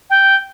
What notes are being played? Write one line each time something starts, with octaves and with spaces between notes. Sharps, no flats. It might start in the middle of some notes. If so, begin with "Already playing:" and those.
G5